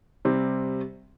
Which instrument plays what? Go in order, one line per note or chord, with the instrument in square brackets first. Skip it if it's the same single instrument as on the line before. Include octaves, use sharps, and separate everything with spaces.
[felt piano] C3 G3 C4